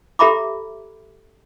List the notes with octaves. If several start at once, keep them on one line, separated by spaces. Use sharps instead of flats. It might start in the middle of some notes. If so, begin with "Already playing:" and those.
G4 A4 E5 A#5 B5 D6